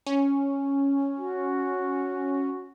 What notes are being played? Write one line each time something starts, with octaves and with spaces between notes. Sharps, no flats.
C#4
F#4